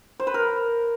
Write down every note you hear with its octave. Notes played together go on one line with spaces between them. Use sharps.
C5
B4
A#4